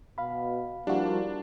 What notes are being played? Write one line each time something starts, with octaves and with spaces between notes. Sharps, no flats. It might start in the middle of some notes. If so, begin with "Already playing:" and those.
B2 F5 B5
F3 G3 A#3 D4 E4 F#4